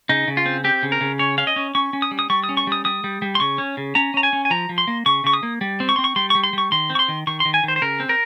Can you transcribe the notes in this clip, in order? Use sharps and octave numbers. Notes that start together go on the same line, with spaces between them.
C#3 D#4
C#3
F4
C4
C4 G4
C#3
A#4
C#3
C#4 C#5
C#4 F5
D#5
C#4
C#4 C#6
C#4
D#6
G3
D#6
G3 C#6
D#6
C#4
C#6
G3 D#6
G3 D#6
G3
G3
C6
C#3 C#6
C#4
C#3
C#4 A#5
C#4 A#5
G#5
C#4
G#5
F3 A#5
F3
C6
A#3
C#3 C#6
C#3 C#6
D#6
A#3
G3
C4
C#6
C4 C6
C#6
G3 C6
G3 C#6
C6
G3 C#6
D#3 C6
C4
C#6
C6
D#3
D#3 C#6
C6
D#3
G#5
D#3 C5
C5
C#3 A#4
C4
A#4